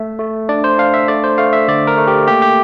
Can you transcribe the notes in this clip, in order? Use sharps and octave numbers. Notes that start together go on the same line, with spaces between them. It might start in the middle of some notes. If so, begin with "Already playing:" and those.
Already playing: A3 E5
A3
D4 D5
C5
D4 F5
E5
A3 D5
C5
A3 F5
E5
D3 D5
A#4
A3
G4
A#3 G4
G4